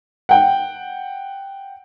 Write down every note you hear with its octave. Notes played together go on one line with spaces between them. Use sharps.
F#5 G5